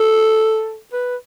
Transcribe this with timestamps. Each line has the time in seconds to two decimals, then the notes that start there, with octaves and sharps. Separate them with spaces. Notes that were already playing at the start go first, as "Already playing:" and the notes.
Already playing: A4
0.93 B4